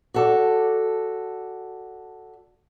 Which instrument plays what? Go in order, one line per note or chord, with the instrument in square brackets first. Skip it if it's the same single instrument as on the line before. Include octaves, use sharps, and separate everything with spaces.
[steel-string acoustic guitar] F#4 A4 D5